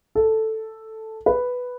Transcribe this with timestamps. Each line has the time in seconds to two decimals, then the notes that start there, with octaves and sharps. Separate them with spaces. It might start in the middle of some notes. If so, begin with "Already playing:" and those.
0.15 A4
1.26 B4